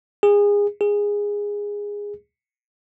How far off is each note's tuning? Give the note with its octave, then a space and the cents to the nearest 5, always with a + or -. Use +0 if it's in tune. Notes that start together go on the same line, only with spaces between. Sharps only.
G#4 -25
G#4 -15